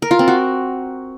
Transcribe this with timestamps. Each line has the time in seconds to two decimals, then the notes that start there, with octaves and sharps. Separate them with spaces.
0.02 A#4
0.11 F4
0.19 C4
0.28 F#4